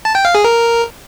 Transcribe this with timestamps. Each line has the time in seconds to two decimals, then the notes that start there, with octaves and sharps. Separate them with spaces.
0.05 A5
0.15 G5
0.25 F5
0.35 G#4
0.44 A#4